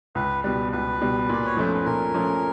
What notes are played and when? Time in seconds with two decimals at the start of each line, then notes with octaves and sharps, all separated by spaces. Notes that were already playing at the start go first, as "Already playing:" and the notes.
0.15 C#2 B4
0.44 B2 G3 B4
0.72 C#2 B4
1.01 B2 G3
1.29 A#2 D5
1.45 C#5
1.57 F3 A3 C#4 C5
1.73 B4
1.85 A#2 A#4
2.14 F3 A3 C#4